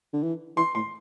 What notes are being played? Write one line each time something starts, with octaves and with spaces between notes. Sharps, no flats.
D3
E3
E3 C6
A2 C6